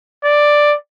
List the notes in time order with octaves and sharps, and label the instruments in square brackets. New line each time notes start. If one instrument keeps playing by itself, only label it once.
[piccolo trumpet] D5